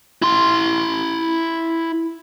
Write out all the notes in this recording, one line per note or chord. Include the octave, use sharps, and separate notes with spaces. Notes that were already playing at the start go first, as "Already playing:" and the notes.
E4 C6